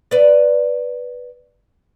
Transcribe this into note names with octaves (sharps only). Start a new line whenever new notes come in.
B4 D5